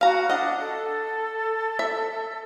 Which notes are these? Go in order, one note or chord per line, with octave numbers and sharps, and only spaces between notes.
F#4 F5 A#5
D4 D#5 F#5
A4
E5